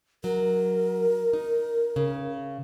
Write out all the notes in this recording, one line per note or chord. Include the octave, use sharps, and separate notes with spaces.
F#3 A#4
D#4
C#3